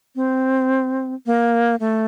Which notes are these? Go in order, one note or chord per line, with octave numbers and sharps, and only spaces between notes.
C4
A#3
A3